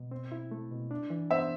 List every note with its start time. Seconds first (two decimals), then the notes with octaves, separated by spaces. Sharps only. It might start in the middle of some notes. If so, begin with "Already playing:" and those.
Already playing: B2
0.11 C4
0.32 E4
0.51 A3
0.72 B2
0.91 D4
1.10 E3
1.30 B3 C5 E5